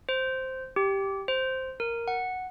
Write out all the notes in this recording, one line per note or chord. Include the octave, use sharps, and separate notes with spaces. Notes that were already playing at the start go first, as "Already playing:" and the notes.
C5
G4
C5
A#4
F#5